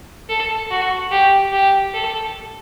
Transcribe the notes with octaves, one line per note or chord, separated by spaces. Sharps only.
A4
F#4
G4
G4
A4